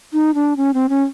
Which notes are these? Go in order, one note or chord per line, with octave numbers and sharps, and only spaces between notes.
D#4
D4
C#4
C4
C#4